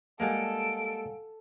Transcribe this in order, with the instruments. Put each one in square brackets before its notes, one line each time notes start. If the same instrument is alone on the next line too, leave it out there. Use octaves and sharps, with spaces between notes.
[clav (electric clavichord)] G3 G#3 A#3 [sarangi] A4 [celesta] F5 F#5 G#5 [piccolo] D7